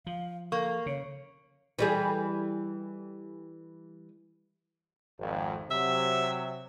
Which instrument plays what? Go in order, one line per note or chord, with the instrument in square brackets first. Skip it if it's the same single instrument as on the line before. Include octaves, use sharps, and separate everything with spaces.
[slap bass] F3 [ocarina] F5
[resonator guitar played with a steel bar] A#3 [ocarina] A4 [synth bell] C#6
[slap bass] C#3 [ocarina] C#5
[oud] E3 G3 G#4
[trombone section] G#1 F2
[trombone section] C3 F#3 [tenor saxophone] E5